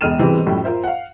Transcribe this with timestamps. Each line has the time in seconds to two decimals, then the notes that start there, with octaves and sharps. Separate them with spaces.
0.01 E1 E2 G#3 F6 D#7 E7
0.18 G#2 B2 E3 G3 C4
0.47 F#2 A2 F3 G3
0.64 F4 A#4 C5 E5
0.84 F5 F#5